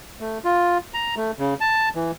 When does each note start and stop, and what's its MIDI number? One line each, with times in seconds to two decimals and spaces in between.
0.20 0.38 57
0.45 0.78 65
0.94 1.15 82
1.16 1.31 57
1.39 1.54 49
1.60 1.89 81
1.95 2.12 52